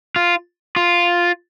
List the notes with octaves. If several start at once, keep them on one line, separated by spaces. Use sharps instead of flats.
F4
F4